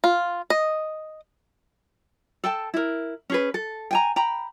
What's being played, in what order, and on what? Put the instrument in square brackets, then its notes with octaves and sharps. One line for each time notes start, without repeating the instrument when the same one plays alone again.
[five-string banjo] F4
D#5
[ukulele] A4 G5 A5
E4 A#4
C#4 G#4 B4
A4
G5 G#5 A#5
G5 A#5 B5